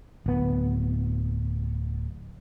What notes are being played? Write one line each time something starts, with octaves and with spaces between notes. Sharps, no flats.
D1 B3